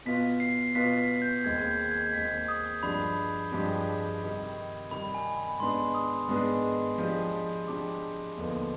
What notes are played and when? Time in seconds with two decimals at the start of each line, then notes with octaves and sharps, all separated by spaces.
0.06 B2 B3 F4 B6
0.40 C7
0.75 B2 B3 F4 B6
0.98 B6
1.22 G6
1.44 D#2 D#3 G#3 C4 G#6
1.67 G6
1.91 G#6
2.13 D#2 D#3 G#3 C4 B6
2.48 D#6
2.83 G2 F3 G#3 D4 G4 B5
3.52 G2 F3 G#3 D4 G4
4.21 C3 D#3 G3
4.91 C3 D#3 G3 B5
5.15 G#5
5.37 B5
5.60 G#2 D#3 B3 D4 G#4 C6
5.94 D#6
6.29 G#2 D#3 B3 D4 G#4
6.98 F3 G#3 D4 G4
7.68 F3 G#3 D4 G4 D6
8.38 D#2 D3 F3 B3 D#4